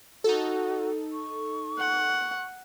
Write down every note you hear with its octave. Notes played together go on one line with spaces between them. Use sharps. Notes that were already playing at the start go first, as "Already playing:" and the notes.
D#4 F#4 A4
C#6
F#5